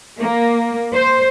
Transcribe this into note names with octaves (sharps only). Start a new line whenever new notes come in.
A#3
C5